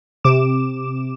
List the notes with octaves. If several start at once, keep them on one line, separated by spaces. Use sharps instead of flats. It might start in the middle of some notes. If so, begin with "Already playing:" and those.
C3 D6 E7